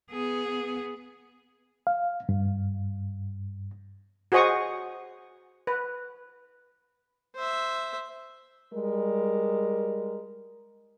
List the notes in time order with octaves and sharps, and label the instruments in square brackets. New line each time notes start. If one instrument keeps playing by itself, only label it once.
[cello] B3 G#4
[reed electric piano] F5
G2
[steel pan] F#4 G#4 C5 D#5 C#6 D#6
B4
[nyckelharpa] C5 E5
[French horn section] G3 G#3 A#4